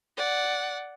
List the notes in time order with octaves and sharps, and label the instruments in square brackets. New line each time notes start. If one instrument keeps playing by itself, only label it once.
[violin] D5 F#5